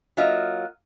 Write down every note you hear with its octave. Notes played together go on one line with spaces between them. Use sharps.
F#3 A#3 F4 D#5 E5